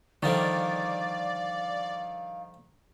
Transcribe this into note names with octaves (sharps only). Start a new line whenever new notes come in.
D3 D#3 F3 G3 D5 F5